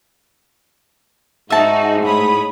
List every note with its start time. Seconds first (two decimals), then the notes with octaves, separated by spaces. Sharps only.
1.50 G#2 D#4 F#4 E5 A5
2.03 A2 C#5 B5 D#6